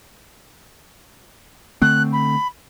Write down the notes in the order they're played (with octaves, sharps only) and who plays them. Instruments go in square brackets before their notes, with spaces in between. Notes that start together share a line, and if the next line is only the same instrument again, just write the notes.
[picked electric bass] D3 A3 C4 [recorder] F#6
[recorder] B5